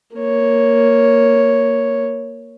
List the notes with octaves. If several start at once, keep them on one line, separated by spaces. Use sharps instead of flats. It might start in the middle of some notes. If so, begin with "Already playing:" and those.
A#3 C#5